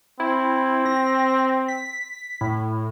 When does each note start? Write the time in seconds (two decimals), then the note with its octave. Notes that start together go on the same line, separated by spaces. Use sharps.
0.20 C4 E4
0.86 A#6
1.68 B6
2.41 A2